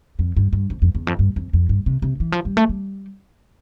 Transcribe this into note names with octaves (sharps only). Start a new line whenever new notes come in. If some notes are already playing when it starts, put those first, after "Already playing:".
F2
G2
G2
F2
F2
E2
F2
G2
F2
F2
G2
C3
C3
E3
F3
G3
A3
G3